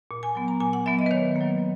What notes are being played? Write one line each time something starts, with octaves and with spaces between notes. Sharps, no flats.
A#2
G#5
F#3 B3
A#5
A#2 G#5
F#5
F#3 B3 E5
D#5
B4
D#3 C#5
F#3 A#3